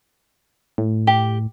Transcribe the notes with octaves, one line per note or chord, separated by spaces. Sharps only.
A2
G4